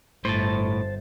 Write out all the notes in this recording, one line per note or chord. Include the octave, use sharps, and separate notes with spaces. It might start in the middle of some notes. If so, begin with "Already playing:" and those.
G1 A2 C5 A5